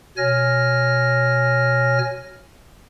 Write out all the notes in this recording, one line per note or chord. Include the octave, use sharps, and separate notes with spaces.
B2 C#5 G#5 F6 A#6